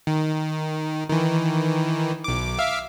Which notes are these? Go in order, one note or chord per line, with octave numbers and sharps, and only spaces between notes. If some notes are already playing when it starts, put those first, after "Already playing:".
D#3
D#3 E3
B1 D6
E5 F5 D6